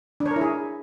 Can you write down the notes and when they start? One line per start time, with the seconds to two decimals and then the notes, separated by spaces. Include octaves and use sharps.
0.20 D4
0.26 C#5
0.31 A#4
0.36 E4
0.41 G#4